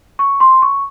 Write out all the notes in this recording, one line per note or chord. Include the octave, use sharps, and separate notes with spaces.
C#6
C6
C#6